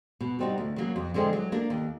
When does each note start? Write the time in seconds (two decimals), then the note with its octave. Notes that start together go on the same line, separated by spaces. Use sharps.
0.20 B2
0.39 G3 C4 D#4 F#4
0.58 D2
0.76 C#3 F#3 A#3
0.96 F2
1.14 D3 F3 G#3 C4
1.33 F#3
1.52 A#3 D4
1.70 D#2